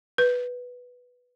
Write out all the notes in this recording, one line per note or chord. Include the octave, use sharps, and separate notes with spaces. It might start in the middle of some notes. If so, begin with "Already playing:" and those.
B4